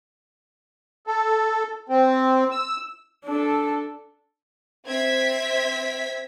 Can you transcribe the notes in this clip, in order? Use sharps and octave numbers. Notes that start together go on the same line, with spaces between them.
A4
C4
E6
D4 A4
C4 E5 G#6 B6